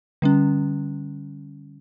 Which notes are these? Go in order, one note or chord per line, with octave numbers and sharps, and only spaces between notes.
D3 G3 C#4